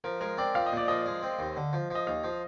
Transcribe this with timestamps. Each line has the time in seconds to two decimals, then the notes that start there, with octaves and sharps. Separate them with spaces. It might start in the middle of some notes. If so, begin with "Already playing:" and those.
0.04 F3 A#4
0.21 G#3 A#4
0.38 C4 D5
0.55 F3 F5
0.66 D#5
0.72 A#2 D5
0.88 F3 D#5
1.06 G#3
1.23 C4
1.39 D#2
1.57 D3
1.73 F3
1.90 F3 D#5
2.07 D#2 F5
2.24 F3